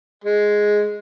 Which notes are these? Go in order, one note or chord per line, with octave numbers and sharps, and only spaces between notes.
G#3